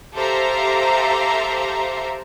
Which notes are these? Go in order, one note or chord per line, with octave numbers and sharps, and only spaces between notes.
G4 A4 C5 E5 F5 A#5